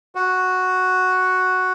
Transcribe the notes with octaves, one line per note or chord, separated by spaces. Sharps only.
F#4